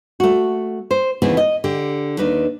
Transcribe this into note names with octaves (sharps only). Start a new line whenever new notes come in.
A3 F#4
C5
D#2 C#3 E3 B3 C4 G#4
D#5
D3 G4
D#2 D4 D#4 B4